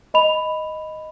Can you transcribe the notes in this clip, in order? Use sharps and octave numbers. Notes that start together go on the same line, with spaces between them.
D#5 B5 F7